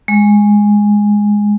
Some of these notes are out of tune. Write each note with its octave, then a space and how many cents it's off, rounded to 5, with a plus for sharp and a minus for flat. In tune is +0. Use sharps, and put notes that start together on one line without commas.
G#3 -5